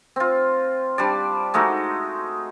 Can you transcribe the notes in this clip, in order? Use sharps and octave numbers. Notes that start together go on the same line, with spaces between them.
C4 F4
G3 D4 D5
G#3 A3 D#4 F#4